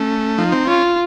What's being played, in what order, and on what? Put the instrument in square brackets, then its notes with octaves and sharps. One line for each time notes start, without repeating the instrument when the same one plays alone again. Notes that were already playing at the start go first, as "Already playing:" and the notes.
Already playing: [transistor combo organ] A3 [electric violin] C#4
[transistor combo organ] F3 [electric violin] D#4
[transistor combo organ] C4
[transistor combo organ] C#4 [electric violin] F4